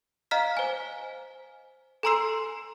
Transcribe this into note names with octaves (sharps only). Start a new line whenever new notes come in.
D#5 F5 A#5 F6 B6
C5 G#5
A4 G#5 A#5 C6 E6 C7